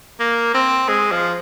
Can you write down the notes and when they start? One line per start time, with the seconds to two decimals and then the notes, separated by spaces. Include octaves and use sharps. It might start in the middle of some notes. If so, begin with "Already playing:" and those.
0.20 A#3
0.54 C4
0.89 G#3
1.11 F3